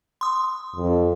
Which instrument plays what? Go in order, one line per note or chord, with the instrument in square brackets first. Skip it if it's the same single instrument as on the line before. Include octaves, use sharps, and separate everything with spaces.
[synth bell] C6 D#6
[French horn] F2